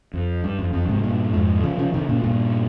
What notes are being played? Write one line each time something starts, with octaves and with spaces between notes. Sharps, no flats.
F2
G2
F2
F2
G#2 C3
G2 A#2
F2 G#2
C#3 F3
C#3 F3
C3 D#3
A#2 C#3
G2 A#2